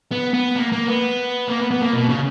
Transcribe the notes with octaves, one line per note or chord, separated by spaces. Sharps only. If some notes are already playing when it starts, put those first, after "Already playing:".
B3
B3
A#3
A#3
B3
A#3
B3
B3
A#3
B2
C#3